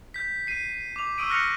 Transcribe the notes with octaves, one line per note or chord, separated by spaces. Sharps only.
G6 B6
C7 D#7
D6 F7
C#6 D#6 E6 D7 D#7
F6 F#6 A#6 C#7 D7 F7